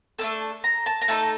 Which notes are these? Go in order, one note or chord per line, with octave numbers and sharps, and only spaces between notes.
A3 D4 A4 A5
A#5
A5
A#5
A3 D#4 A4 A5